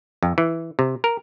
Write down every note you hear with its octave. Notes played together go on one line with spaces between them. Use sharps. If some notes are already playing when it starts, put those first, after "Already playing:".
F2
E3
C3
A#4